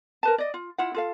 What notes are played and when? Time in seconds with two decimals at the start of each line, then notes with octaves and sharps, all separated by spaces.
0.23 A#4 B4 A5
0.38 D5 D#5
0.54 F4
0.78 E4 F4 F#5
0.94 F4 A4 F5